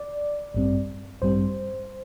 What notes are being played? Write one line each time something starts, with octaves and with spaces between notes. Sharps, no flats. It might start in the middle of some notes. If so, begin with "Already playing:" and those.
Already playing: D5
A1 G2 G3 C4
A1 G2 G3 C4 C5